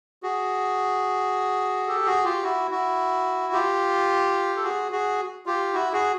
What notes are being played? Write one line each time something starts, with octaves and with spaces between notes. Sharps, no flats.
F#4 G#4
G4 A4
F#4 G#4
F4 G4
E4 F#4
E4 F#4
F4 G4
A4
F#4 G#4
F#4 G#4
F4 G4
E4 F#4
F#4 G#4